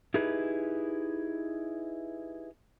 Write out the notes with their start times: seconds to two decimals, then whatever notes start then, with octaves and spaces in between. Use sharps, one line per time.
0.14 D#4 E4 G4 G#4 B4